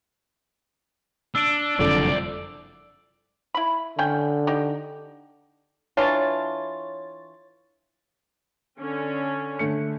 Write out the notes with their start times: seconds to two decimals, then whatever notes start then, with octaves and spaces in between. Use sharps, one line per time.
1.35 D4 E6 D7
1.79 F#1 C2 F2 D3 D5
3.54 E4 B5
3.99 D3 C#4 G5
4.47 D#4 G4
5.97 E3 D4 F4 C#5 A6
8.79 D3 C#4
9.59 D3 A3 C#7